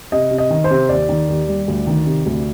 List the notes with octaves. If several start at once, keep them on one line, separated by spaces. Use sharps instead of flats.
C3 D#5
C3
D#5
D#3
C5
C3
D#2 D5
D#3
D#2
G3
D2
D#3
C3
D2